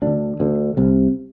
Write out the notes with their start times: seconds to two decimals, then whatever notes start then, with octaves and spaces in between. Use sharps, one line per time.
0.02 D2 D3 D4
0.40 D2 D3
0.77 C2 C3